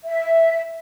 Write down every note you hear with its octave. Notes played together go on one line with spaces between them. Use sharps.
E5